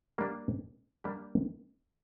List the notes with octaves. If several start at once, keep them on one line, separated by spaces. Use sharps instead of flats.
G3 A#3 D4 G4
G3 A#3 D4 G4